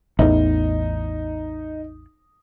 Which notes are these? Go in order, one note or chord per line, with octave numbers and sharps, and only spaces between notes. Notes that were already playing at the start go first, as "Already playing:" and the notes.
A1 E2 D#4